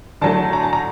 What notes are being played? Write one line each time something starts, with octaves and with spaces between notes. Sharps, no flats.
D3 F#3 A3 A5
A#5
A5
A#5